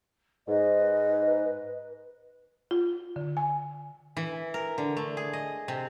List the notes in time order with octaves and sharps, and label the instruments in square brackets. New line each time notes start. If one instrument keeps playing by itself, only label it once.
[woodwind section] G#2 [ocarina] B4 [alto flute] D#5
[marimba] F4
D3
G#5
[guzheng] E3
A#4
D3
A3
G#4
D#5
C3